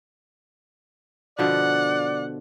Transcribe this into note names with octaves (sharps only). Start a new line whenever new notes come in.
B2 D3 F3 D5 F#5